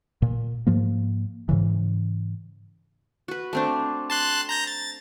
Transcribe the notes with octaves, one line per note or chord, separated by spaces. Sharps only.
A#2
G#2 F3 A#3
G#2 C#3 E3
F#4 B4
A3 C4 D4
A5 C6 F#6
A#5 G6 A#6
A6